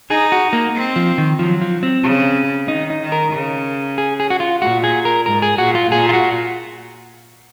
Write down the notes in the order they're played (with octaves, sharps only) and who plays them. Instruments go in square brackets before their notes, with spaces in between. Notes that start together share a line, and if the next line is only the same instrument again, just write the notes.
[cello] D#4 [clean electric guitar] G#4
[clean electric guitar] F#4
A#3
[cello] C4
[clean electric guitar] F3
D#3
[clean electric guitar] F3 [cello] F#3
[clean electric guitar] F3
C4
[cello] C#3
[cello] D#3 [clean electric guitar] D#4
[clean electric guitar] D#4
[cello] D#3
[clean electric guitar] A#4
[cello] C#3
[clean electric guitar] G#4
G#4
F#4
F4
[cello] A#2 [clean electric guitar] F#4
[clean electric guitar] G#4
A#4
[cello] G#2 [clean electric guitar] A#4
[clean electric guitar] G#4
[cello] A#2 [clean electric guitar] F#4
[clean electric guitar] F4
[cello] A#2 [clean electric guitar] G#4
[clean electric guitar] F4
F#4